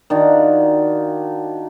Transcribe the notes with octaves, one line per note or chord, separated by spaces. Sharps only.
D#3 D4 F4 F#4